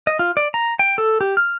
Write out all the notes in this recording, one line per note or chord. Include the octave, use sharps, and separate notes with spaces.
D#5
F4
D5
A#5
G5
A4
G4
F6